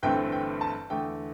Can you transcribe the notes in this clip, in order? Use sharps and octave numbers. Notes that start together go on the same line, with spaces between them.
G1 G2 E3 A3 C4 G5
G5
A5
E2 D3 A3 G5